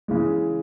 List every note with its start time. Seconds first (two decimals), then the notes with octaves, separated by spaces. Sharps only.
0.08 C#3 E3 G#3